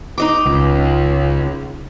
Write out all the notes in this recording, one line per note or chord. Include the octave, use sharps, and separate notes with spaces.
D#4 D#5 D6
C#2